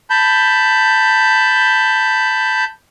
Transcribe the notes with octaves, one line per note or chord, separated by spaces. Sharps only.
A5 B5 G6